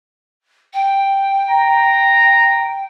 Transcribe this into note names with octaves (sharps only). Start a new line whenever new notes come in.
G5
A#5